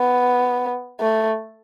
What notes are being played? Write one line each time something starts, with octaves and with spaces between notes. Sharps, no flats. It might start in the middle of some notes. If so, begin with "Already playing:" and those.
Already playing: B3
A3